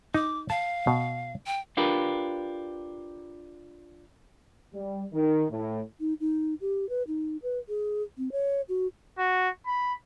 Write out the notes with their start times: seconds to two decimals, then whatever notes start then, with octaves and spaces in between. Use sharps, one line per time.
0.14 D#4 D6
0.50 F5 A5
0.87 B2
1.47 G5
1.77 D4 F4 G4 A#4 B4
4.74 G3
5.13 D#3
5.50 A2
6.00 D#4
6.20 D#4
6.61 G4
6.89 B4
7.07 D#4
7.43 B4
7.69 G#4
8.18 C4
8.32 C#5
8.69 F#4
9.18 F#4
9.67 B5